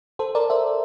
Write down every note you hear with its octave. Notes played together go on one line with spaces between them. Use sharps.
A4 C5
A#4 D5
C5 E5